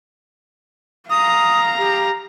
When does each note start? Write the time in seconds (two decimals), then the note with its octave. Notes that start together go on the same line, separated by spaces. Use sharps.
1.10 F5 A#5 D#6
1.78 G4